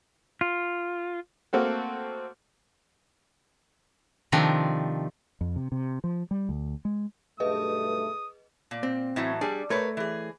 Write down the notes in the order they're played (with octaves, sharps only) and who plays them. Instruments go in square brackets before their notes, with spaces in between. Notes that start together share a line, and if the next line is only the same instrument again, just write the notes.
[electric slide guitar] F4
[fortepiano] A3 A#3 C4 F#4 A4
[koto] C3 D#3 F3 A3 D4
[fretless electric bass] F2
C3
C3
F3
G3
D2
G#3
[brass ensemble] B1 G2 A3 [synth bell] G#4 B4 D#5 [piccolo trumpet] D#6
[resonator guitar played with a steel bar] A#2
[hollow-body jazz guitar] C4
[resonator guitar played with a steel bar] A2 E3 F#3
[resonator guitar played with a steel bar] G3 [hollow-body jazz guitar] D4 G#4
[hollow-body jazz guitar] A3 C#5 [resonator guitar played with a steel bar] A#4 B4
[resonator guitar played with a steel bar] E3 G#4